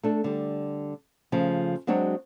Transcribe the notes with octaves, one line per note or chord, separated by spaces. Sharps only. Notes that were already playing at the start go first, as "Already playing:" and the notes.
A3 D4 A4
D3 G3
C#3 F3 A3
F#3 G#3 C4 D4 F#4 C#5